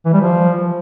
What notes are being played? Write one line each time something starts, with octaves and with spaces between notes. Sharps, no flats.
E3
G3
F3